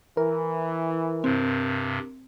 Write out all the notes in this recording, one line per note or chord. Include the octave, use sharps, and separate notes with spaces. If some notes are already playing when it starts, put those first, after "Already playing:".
E3 A#4
G2 C3 C4